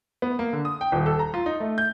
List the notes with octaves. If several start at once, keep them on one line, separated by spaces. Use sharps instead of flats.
B3
A#3
D3
D#6
G5
D#1
A4
A#5
F4
D#4
A3
G6